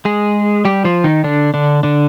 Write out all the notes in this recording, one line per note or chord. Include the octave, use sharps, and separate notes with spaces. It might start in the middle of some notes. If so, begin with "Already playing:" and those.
G#3 G#4
G3 G4
F3 F4
D#3 D#4
D3 D4
D3 D4
D3 D4